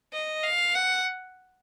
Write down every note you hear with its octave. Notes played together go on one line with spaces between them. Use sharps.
D#5
F5
F#5